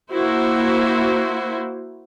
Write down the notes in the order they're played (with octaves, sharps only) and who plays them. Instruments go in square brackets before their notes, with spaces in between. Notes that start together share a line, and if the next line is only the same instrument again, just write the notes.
[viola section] A#3 E4 F#4 C5